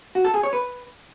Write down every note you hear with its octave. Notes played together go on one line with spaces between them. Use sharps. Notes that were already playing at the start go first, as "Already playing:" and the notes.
F#4
A4
G#4
C#5
B4